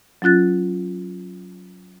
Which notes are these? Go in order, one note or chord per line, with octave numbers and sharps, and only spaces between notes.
F#3 C#4 F4 F#6 A6